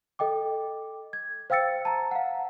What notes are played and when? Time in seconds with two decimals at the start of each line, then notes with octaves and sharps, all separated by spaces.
0.19 A4 D#5 G5 D6
1.13 G#6
1.50 C5 F5 G5 E6 A6 C#7
1.85 A5 A#5
2.11 F5 F#5